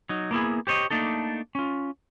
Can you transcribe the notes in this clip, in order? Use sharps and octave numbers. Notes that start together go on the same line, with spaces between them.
F#3 D#4
A#3 B3 E4 G#4
G4 C5 C#5 D#5
A3 A#3 D4 D#4 A4
C#4 F4